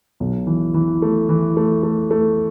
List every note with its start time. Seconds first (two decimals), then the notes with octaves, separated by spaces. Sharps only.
0.20 B1
0.47 E3
0.74 E3
1.02 A3
1.29 E3
1.57 A3
1.83 A3
2.11 A3